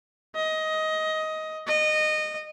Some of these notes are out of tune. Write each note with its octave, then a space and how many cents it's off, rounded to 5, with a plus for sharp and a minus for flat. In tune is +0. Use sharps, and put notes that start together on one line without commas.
D#5 +15
D#5 -20